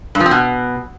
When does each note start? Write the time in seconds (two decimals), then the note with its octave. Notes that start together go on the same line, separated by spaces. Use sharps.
0.15 G2
0.20 F3
0.26 C4
0.31 B2